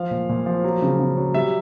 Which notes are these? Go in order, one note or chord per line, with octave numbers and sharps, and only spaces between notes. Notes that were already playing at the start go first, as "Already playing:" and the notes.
Already playing: F3 F5
A#2
A#2
F3
F#3
C#3
C#3
F#3
G3 E5